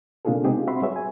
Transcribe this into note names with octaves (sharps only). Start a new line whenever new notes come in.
C3 A#3 D4 F4 G#4 A4
G#3 B3 C4 D#4 G4 G#4
F4
C4 F#4 E5 B5 C6
G3 F#4 G#4 B4 C#5 E5
G#5